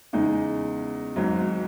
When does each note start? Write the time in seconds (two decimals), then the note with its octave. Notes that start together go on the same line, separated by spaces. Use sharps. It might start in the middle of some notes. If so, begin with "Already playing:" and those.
0.13 E2 C#3 G#3 D#4
1.16 G#1 G#2 F#3